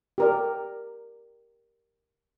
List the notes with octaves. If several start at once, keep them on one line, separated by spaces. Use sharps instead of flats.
G4 A#4 D5